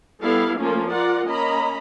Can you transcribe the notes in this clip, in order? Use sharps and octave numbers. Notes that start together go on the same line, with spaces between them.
G3 B3 E4 A4 F5
F3 A3 A#3 C#4 F4
F4 A#4 D5 F#5
A#3 C#4 D#5 A#5 B5